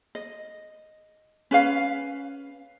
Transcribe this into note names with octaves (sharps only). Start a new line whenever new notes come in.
D#5
C#4 B4 F5